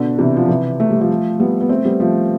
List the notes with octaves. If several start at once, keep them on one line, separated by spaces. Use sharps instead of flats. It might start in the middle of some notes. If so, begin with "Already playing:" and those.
Already playing: B2 D3
C3 E3
F3
C3 E3
A3
G3
F3 A3
G3 B3
B3
A3 C4
G3 B3
F3 A3